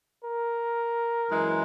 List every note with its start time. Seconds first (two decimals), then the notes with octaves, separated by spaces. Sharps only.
0.24 A#4
1.30 F#2 E3 G#3